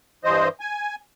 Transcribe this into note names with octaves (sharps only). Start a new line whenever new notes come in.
G2 E3 C5 D#5
G#5